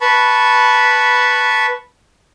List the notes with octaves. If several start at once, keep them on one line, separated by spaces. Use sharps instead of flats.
B4 A5 B5 C#6